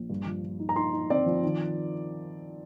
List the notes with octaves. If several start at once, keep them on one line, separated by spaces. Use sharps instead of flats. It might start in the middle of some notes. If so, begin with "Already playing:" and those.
Already playing: A#1
G2
F3
F3
D#4
A#5
D#4 C6
D#4
C4 D5
F3
D#3